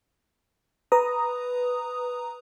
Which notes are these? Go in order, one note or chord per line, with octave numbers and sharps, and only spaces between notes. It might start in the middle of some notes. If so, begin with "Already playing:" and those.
B4 A#5 D#6